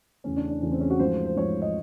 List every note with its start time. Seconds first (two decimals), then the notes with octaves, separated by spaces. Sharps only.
0.24 E2 C#3 E3 A3 C#4
0.36 D4
0.50 D4
0.62 E2 C#3 E3 A3 C#4
0.72 C4
0.80 C#4
0.90 F#4
0.99 G#2 F3 A3 C5
1.26 C5
1.36 G#2 F3 A3 C#5
1.62 D#5